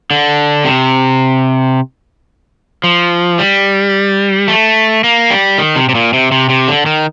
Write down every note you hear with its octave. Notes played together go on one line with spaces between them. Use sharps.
D3
C3
F3
G3
A3
A#3
G3
D#3
C3
C3
A#2
C3
C3
C3
D3
D#3